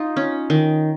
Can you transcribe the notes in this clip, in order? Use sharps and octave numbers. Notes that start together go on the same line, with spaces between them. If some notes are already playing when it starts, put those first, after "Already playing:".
Already playing: D#4 F4
C#4
D#3